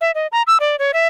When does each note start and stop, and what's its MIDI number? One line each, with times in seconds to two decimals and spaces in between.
0.01 0.11 76
0.15 0.27 75
0.32 0.42 82
0.47 0.58 88
0.60 0.76 74
0.79 0.92 73
0.94 1.07 76